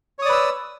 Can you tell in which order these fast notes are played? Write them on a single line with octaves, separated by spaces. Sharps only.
C#5 D#6 D5 B4 E6